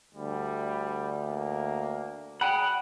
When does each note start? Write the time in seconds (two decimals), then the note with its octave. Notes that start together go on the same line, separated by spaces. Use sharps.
0.14 D2 G3
1.26 A#3
2.41 G#4 F#5 G5 B5